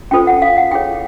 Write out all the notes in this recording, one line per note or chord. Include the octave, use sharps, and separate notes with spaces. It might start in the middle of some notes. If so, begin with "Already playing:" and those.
C#4 F4 A4 C5 G5
F#5
F5
F#5
E4 G#4 C#5 G5